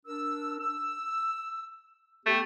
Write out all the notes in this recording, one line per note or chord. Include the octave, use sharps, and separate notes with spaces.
D4 A#4 E6
E6
A3 B3 G4